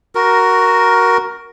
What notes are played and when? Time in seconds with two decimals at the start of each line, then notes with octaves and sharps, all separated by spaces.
0.15 F#4 A#4